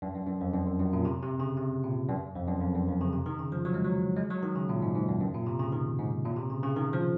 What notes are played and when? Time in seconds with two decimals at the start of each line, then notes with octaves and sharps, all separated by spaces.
0.02 F#2
0.15 F#2
0.27 F#2
0.41 F2
0.54 F#2
0.66 F#2
0.80 F#2
0.93 A#2
1.05 C3
1.22 C3
1.40 C#3
1.57 C3
1.84 A#2
2.09 F#2
2.35 F2
2.48 F#2
2.61 F2
2.75 F#2
2.88 F2
3.01 C#3
3.13 C3
3.26 D#3
3.39 C#3
3.52 F3
3.65 F#3
3.74 G#3
3.85 F#3
4.17 G#3
4.30 F#3
4.43 D#3
4.56 C#3
4.69 A#2
4.82 G#2
4.95 G#2
5.08 F#2
5.21 F#2
5.34 A#2
5.46 C3
5.59 C#3
5.72 D#3
5.99 G#2
6.25 A#2
6.37 C3
6.50 C#3
6.63 C#3
6.76 D#3
6.93 F3